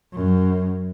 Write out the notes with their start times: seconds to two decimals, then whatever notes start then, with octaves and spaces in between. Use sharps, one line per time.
0.13 F#2